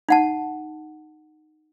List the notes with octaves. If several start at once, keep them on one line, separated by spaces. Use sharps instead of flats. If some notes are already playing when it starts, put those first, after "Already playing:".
D#4 F#5 A5